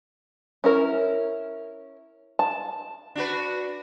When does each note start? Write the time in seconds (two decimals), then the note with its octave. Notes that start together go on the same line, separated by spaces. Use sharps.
0.64 C#4 E4 A#4
2.39 A5
3.15 D4 F#4 B4